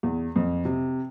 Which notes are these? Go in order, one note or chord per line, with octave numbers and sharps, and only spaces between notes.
E2
F2
C3